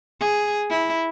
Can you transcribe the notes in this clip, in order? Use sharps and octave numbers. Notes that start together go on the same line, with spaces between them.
G#4
E4